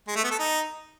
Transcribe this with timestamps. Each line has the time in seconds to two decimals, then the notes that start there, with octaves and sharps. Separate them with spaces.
0.08 G#3
0.16 A3
0.24 B3
0.31 A4
0.39 D#4